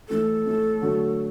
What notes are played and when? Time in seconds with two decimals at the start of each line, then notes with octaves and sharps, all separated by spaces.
0.09 A2 E3 A3 A4
0.46 A2 E3 A3
0.81 D3 F#3 A3